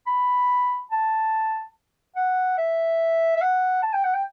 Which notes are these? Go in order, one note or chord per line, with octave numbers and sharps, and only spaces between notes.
B5
A5
F#5
E5
E5
F#5
A5
G5
F#5
G5